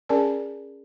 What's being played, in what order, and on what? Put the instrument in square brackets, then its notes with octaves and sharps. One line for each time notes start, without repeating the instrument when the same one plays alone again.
[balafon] C#4 G#4 A#4 D5 G#5 A5